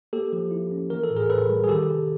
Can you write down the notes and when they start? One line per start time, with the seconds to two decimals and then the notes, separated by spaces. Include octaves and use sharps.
0.13 A#3 G4 A4
0.32 F3
0.51 E4
0.72 C#4
0.90 E3 A#4
1.03 A4
1.10 A2
1.16 G#4 A#4
1.30 A2 A4 B4
1.49 G3
1.64 G#4
1.69 D#3 G4 A4
1.88 C3